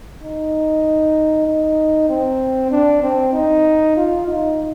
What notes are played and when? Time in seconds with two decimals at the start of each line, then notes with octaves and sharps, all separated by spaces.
0.23 D#4
1.47 D#4
2.10 C4
2.71 D4
3.03 C4
3.34 D#4
3.96 F4
4.27 D#4